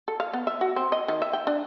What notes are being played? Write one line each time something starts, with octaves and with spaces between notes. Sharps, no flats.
A4
F5
B3
E5
F#4
C4
D#5
D#3
E5
G5
D4